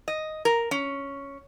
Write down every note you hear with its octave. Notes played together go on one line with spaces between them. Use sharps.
D#5
A#4
C#4